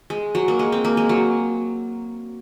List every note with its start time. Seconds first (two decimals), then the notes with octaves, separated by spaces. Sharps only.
0.10 G#3
0.35 F#3
0.48 A#3
0.59 G#3
0.72 C4
0.85 A#3
0.97 G#3
1.09 F#3